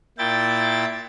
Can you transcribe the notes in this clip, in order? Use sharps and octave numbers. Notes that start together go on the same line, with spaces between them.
A#2 E4 G5 A6